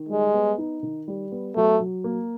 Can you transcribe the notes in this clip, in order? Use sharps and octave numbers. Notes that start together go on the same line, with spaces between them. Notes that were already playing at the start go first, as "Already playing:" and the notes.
Already playing: D#3
G3 G#3
B3
D#4
D#3
G3
B3
F#3 A3
F#3
A#3